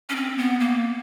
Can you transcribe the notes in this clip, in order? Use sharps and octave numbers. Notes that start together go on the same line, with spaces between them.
C#4
C4
B3
A#3